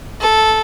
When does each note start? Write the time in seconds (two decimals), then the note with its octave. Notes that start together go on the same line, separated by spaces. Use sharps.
0.21 A4